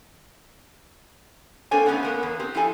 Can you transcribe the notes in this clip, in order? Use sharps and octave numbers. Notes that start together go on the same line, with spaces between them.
A#3 C4 D4 A4 C#5 G#5
A3 B3 C#4 D#4 C5 F#5
A#3 B3 A#4
E2
C4 G4
F3 E4 A4 G#5